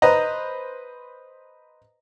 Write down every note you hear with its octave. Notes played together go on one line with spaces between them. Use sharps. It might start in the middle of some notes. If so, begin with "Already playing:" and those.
B4 C5 D#5 A#5